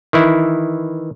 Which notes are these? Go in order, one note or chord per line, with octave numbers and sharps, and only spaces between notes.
D#3 E3 E4